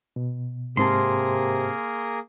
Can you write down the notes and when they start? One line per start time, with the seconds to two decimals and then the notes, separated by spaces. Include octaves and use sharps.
0.16 B2
0.77 G#2 C3 A#3 C4 G#4 A#4 A5 C6